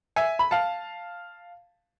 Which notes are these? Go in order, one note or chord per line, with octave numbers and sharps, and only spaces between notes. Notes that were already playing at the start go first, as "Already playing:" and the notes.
E5 G#5
B5
F5 A5